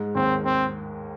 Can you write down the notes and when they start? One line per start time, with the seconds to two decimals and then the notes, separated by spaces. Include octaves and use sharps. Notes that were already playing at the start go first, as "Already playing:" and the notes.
Already playing: G#2 G#3
0.15 D#2 D#3 C4
0.45 C4